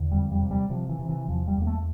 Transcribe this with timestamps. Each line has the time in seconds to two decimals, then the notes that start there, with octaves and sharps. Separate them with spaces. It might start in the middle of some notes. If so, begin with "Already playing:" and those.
Already playing: E2 D3
0.12 F2 G3
0.32 G3
0.41 C3
0.51 G3
0.70 C3 F3
0.89 E3
0.99 C3
1.09 E3
1.28 E2 F3
1.48 G3
1.58 E2 A#3
1.67 A3